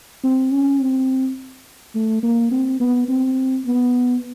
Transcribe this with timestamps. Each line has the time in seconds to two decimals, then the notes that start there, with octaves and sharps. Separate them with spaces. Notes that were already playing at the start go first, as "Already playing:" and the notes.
0.23 C4
0.52 C#4
0.80 C4
1.95 A3
2.23 A#3
2.51 C4
2.80 B3
3.08 C4
3.66 B3